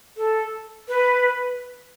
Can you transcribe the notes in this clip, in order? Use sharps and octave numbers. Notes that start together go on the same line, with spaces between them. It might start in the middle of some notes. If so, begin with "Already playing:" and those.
A4
B4